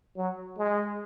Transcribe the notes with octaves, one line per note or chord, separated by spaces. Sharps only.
F#3
G#3